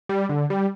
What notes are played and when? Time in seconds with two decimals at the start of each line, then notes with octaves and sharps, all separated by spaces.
0.09 G3
0.29 D3
0.50 G3